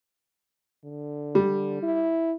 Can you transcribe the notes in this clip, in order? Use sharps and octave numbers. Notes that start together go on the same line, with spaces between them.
D3
G3
E4